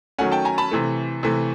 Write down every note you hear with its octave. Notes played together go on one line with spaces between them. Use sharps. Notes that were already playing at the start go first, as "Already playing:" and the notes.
D#3 F#3 A3 C#4 F#5 G#5
G5 A5
G#5 A#5
A5 B5
C3 E3 A3
C3 E3 A3